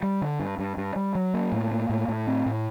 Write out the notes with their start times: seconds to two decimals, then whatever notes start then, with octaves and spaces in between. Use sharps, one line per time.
0.03 G3
0.21 D3
0.40 G2
0.59 G2
0.77 G2
0.96 G3
1.15 F#3
1.34 A#3
1.52 A2
1.71 A#3
1.90 A2
2.08 A2
2.27 C4
2.46 A2